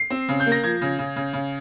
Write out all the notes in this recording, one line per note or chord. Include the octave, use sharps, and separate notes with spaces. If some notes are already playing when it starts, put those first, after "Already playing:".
Already playing: C7
C4
C#3
G6
A#3
A#6
F3 G#6
C#3
C#3
C#3
C#3